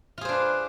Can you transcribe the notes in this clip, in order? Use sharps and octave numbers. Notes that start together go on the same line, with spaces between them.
D4 F4 G#4 B4 C5